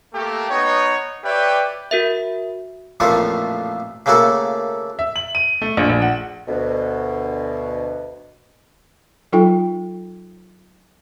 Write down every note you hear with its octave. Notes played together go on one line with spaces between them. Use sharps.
A3 A#3 G4
B3 D#4 C#5
G4 B4 C#5 D5 E5 G5
F#4 A#4 E5
A1 F2 A#2 A3 F4 C#6
C#3 A3 A#3 F#4 A4
E5
F#7
D#7
A3
A#1
A#1
F#5
D2 B2
F#3 D#4 F4 A4 G5